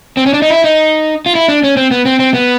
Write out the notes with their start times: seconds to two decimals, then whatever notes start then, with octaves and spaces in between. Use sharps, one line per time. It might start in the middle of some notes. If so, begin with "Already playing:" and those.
0.17 C4
0.26 C#4
0.34 D4
0.42 D#4
0.50 E4
0.64 D#4
1.26 F4
1.35 E4
1.48 D4
1.64 C#4
1.77 C4
1.91 B3
2.06 C4
2.19 C4
2.34 B3